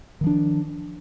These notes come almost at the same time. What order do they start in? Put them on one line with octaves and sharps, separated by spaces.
D#3 F3 D4